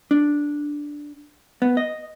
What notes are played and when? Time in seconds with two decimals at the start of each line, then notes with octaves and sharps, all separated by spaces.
0.11 D4
1.62 B3
1.77 D#5